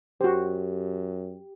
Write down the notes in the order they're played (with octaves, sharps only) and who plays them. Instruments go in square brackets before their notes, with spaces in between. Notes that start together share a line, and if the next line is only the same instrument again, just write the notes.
[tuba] F#2 [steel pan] F#4 C5 [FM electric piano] G4